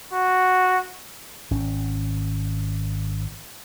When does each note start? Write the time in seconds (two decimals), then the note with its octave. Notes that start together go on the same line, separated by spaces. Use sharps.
0.12 F#4
1.51 G#1 C#4